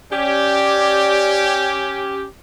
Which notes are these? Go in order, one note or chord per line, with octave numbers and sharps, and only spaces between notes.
C#4 G4 D5